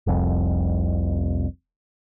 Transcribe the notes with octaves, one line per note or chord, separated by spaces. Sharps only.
F1 C2 F2